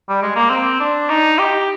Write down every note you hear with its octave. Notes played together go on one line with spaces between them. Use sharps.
G3
G#3
A#3
C4
D4
D#4
G4